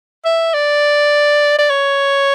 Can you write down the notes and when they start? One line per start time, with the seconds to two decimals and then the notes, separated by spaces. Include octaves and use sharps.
0.25 E5
0.54 D5
1.58 D5
1.70 C#5